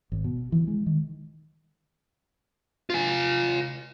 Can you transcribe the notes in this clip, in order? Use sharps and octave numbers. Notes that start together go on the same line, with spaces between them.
G#1
B2
E3
G#3
D#3
F4 G#5